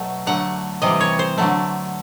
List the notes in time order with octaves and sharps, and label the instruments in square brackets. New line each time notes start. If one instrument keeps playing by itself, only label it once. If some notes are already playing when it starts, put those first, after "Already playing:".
Already playing: [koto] B2 F#3 A3
D3 F#3 A3 F#5
C3 E3 G3 D#5
C#5
C5
D3 F#3 A3